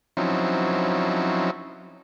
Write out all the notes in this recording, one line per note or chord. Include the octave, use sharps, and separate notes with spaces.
F3 F#3 C4 C#4 D#4 E4